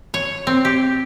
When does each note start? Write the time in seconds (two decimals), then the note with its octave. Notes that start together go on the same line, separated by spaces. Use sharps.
0.14 C#5
0.47 C4
0.65 G4